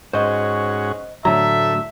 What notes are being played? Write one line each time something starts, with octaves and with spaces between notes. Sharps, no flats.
G#2 C#4 F#4 C5 D#5
A2 D3 F#3 A3 E5 A#5